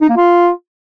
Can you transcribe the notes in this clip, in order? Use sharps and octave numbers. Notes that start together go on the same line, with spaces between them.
D#4
A#3
F4